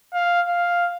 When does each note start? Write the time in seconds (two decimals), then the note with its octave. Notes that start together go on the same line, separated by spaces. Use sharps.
0.13 F5
0.48 F5